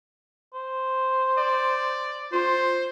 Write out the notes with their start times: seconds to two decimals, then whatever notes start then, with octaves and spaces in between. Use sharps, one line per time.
0.54 C5
1.38 D5
2.33 F4 C5